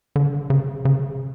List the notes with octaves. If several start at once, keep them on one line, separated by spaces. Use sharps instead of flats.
D3
C#3
C#3